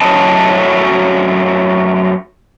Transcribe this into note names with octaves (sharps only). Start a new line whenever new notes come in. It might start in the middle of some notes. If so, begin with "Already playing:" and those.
F#2 F#3 A3 C#4 D#5 A5